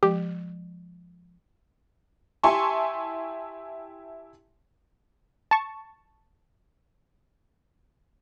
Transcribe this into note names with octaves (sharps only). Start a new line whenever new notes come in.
F3 G#3 G4
E4 G4 G#5 A5 C6 C#6
A5 C#6